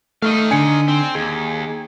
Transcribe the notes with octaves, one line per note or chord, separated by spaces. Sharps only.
A3 D#4 F5
D3 D4 G#5 C#7
C4
D#2 G#4